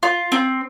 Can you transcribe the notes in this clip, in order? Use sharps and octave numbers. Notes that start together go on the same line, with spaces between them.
F4
C4